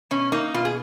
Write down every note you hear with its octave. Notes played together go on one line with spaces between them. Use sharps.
B2 C#4
A#3 D#4
B2 F4
G#4